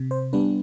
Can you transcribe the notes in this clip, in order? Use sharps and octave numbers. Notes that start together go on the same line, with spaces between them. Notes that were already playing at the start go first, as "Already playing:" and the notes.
Already playing: C3
C5
G3 B3 D4 B4